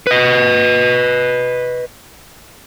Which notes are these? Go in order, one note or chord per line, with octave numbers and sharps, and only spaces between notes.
B4 D#5